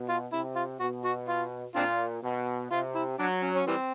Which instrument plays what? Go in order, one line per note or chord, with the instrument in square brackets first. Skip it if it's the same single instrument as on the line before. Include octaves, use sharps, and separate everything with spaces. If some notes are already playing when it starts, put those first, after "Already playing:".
Already playing: [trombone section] B2
[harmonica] F4
[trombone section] C3 [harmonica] E4
[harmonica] F4
[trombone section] B2 [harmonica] F#4
[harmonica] F#4
F4
[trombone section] A#2 [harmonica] C4 D4 F4
[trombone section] B2
[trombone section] C3 [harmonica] F4
[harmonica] E4
[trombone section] F#3 [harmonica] D4
[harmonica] C#4
C#4
E3 G3 C4